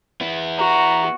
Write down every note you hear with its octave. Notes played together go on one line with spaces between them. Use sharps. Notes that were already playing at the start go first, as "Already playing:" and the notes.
B3 E4
F#4 A#5